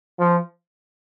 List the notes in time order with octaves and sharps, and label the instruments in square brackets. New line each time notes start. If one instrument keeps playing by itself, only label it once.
[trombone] F3